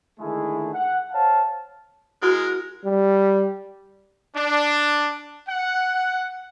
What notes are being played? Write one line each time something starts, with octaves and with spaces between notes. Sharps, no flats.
D3 D#3 G#3 A3 E4 G#4
F#5
C5 C#5 F5 A5
G#3 E4 F#4 A#4 F#5
G3
D4
F#5